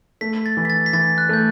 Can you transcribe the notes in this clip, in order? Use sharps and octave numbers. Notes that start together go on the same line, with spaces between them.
A3 B6
A6
E3
B6
A6
B6
E3 A6
F#6
A3 G6